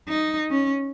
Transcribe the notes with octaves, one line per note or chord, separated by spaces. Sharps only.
D#4
C#4